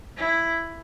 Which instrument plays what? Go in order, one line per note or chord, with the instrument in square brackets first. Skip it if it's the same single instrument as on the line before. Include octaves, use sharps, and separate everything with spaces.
[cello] E4